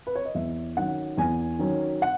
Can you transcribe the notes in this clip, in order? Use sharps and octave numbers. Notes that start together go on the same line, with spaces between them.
B4
C#5
D#5
E2 E5
D#3 F#3 C#4 F#5
E2 G#5
D#3 F#3 C#4
F#5